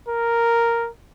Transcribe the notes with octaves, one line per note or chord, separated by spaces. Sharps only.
A#4